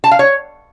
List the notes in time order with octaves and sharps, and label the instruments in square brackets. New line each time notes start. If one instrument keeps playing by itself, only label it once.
[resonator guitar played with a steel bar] A5
F5
C#5